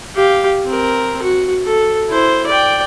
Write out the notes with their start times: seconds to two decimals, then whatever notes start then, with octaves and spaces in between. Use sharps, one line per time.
0.15 G4 F5
0.65 C4 A#4
1.22 F#4
1.65 A4
2.09 E4 C5
2.47 D5 G5